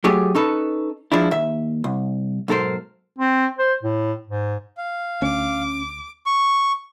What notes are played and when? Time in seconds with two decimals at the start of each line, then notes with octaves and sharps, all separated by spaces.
0.04 F#3 A3 G4 G#4
0.35 C#4 D#4 A4 B4
1.12 F3 G#3 D4 E4
1.31 D#2 E5
1.84 C2
2.48 B1 G#2 A4 A#4 C5
3.18 C4
3.59 C5
3.83 A2
4.27 G#2
4.78 F5
5.22 D2 C#4 D6
6.26 C#6